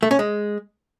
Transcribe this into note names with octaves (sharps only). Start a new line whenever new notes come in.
A3
C#4
G#3